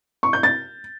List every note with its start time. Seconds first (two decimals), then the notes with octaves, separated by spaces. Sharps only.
0.23 C#6
0.33 G6
0.43 A6